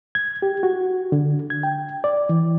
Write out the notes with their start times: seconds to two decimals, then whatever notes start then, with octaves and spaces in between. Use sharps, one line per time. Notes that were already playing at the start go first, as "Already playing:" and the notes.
0.15 G#6
0.42 G4
0.63 F#4
1.12 D3
1.50 G#6
1.63 G5
2.04 D5
2.29 E3